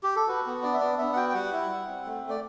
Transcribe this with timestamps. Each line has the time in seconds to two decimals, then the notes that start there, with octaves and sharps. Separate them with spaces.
0.03 G4
0.16 A4
0.28 F#4 B4
0.46 B3
0.63 D4 D5
0.74 E5
0.81 B3 D5
0.98 B3 E5
1.13 F#5
1.16 F#4 G5
1.29 G5
1.34 G3 F#5
1.52 E4
1.70 G3
1.87 C4
2.05 A3
2.23 A3
2.29 D5